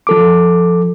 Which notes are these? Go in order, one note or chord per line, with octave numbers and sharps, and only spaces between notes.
F3 A4 D6